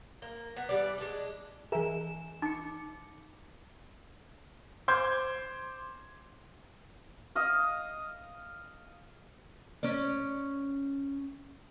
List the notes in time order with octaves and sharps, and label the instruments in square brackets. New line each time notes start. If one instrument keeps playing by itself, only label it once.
[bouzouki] A#3
B3
E3 G3 D5
G#3 D4
[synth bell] E3 G#5 E7 [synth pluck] G#4 A#4 E5
[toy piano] D#4 [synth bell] D6 C#7
[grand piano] C5 C6 D6 G6 G#6
[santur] D#5 F5
[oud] C#4 D5